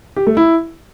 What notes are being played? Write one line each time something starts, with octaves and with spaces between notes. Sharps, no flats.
G4
A3
E4